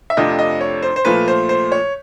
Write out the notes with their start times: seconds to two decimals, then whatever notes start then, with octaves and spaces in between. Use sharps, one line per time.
0.10 E5
0.17 F2 C3 F3 A3 D4 D#5
0.39 D#5
0.61 C#5
0.82 C5
0.96 C5
1.05 A#2 F3 A3 B4
1.28 C5
1.49 C5
1.72 C#5